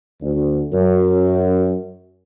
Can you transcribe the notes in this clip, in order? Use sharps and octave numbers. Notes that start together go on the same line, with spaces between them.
D2
F#2